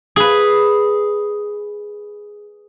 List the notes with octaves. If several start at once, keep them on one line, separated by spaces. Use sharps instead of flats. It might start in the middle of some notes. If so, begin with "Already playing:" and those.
G#4 B4